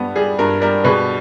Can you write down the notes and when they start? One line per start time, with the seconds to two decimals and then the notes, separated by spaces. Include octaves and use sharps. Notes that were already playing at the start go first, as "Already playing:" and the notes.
Already playing: G2 G3 B3
0.16 G3 G#4
0.38 G2 A#4
0.61 G3 A#4
0.84 B2 G#4 B4